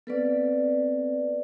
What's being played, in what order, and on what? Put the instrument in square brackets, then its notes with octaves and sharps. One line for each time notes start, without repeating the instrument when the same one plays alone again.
[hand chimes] B3 C4 [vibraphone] A4 B4 D5